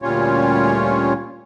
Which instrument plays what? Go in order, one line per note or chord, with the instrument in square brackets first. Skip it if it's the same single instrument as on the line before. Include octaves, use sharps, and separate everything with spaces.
[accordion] D2 A#2 G3 C#4 F4 C#5